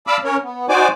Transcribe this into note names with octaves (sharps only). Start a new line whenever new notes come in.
D5 F5 A5 B5 D6 E6
C#4 A#4 C#5
B3
D#4 F#4 C5 D5 G#5 D6